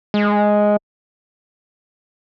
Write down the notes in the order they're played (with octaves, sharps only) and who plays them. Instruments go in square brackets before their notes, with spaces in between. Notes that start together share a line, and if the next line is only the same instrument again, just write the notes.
[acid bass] G#3